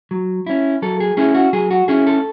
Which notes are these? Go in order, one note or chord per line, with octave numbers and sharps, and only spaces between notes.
F#3
C#4 E4
F#3 A4
G#4
C#4 E4 G#4
F#4
F#3 G#4
F#4
C#4 E4 G#4
A4